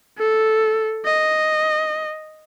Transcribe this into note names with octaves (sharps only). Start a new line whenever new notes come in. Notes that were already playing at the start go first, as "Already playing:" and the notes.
A4
D#5